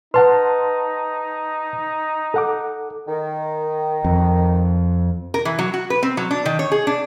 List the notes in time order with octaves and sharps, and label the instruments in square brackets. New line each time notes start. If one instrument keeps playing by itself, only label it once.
[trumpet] D#4 [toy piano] B4 [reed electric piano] F#5 A5 C6
[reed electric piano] A4 F#5 D6
[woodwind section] D#3
[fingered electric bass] F2
[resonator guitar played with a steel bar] A#4
E3
F#3
F#4
B4
C4
F#3
D4
D#3
C#5
G#4
D4